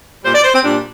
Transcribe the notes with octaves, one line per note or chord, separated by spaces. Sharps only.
A#2 G3 C5
D5
C5
C4
A#2 G3 D4